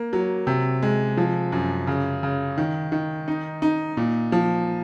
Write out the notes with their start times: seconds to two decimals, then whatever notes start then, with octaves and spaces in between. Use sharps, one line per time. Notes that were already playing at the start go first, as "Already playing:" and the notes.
Already playing: A#3
0.13 F#3
0.47 C3
0.82 G#3
1.17 F3
1.52 F#2
1.87 C#3
2.23 C#3
2.58 D#3
2.92 D#3
3.28 D#4
3.62 D#4
3.97 A#2
4.32 F3